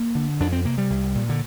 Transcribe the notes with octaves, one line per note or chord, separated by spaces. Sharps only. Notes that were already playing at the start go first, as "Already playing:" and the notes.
Already playing: A#3
D3
F2 D4
C4
C3 A#3
G3
C2
A#2
D3